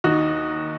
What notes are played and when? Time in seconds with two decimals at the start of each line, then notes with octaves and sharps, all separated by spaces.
0.04 D#2 D#4 F#4